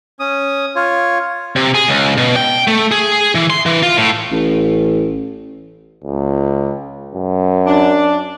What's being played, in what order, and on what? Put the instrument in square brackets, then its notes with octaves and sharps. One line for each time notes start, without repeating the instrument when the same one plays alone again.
[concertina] C#4 D#6
F4 C#5
[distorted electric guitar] C3
G#4
C#2
B2
G5
A3
G#4
E3
C6
E3
F4
A2
[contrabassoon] A1
[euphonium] C#2
F#2
[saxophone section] D4